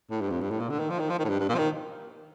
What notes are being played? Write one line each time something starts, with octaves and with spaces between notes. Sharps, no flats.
A2
G2
F2
G2
A2
A#2
D3
D#3
F3
D#3
F3
D#3
A2
G2
G2
A#2
F3
D#3